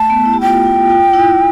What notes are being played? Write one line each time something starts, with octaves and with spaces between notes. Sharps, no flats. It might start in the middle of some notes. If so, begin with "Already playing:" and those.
Already playing: A3 A5
B3
E4
G4
F4 G5
F4
F4
F4
E4